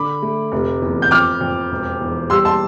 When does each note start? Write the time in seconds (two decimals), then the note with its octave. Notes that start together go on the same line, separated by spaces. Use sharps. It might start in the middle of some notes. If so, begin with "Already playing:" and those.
Already playing: D3 B5 D6
0.22 A3
0.52 F1
0.82 E2
1.02 G6
1.11 F2 D6 F6
1.41 F2
1.71 E1
2.01 E2
2.30 G3 C6 E6
2.45 A5 C6